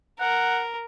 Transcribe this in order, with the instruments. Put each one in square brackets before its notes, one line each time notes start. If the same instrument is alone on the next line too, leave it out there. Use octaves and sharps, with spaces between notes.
[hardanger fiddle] A#4 [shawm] F#5